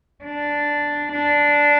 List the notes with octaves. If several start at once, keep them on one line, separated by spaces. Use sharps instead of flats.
D4
D4